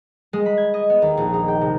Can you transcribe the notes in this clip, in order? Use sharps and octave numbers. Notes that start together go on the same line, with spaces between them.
G#3
B5
G#6
D#5
B3
D#2
A#1
D#4
G5
C3